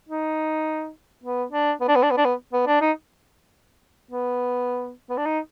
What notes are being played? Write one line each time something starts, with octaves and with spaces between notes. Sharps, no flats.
D#4
B3
D4
B3
D4
B3
D4
B3
D4
B3
B3
D4
D#4
B3
B3
D4
D#4